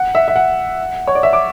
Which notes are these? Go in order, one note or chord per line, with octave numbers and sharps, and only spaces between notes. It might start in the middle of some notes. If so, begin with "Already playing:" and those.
Already playing: F#5
E5
E5
F#5
C#5
D5
E5
D6